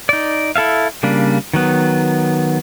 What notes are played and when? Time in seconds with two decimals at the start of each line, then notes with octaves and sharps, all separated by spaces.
0.09 D#4 D5
0.56 E4 A4 E5 F5
1.03 C#3 G3 A#3 D4
1.53 D#3 F#3 B3